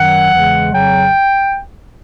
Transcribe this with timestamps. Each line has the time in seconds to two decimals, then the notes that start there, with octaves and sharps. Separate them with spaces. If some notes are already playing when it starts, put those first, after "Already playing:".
Already playing: F#2 D#3 F#3 F#5
0.30 E2 C#3 E3 G#3
0.70 F2 C#3 F#3 G5